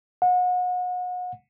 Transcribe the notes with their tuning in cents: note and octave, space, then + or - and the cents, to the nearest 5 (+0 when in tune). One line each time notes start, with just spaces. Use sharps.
F#5 -35